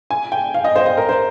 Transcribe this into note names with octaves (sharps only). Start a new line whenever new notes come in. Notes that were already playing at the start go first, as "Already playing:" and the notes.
G#5
G5
F5
D#5
C5
C5
A#4
C5